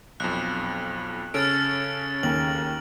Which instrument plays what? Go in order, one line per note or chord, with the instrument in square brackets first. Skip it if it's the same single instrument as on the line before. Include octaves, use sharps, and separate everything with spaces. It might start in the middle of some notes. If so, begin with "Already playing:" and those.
[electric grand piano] B1 F2 [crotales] F#6
[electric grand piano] C#3 C#4 A4 [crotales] F6 A6 D7
[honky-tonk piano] D#2 [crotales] F#7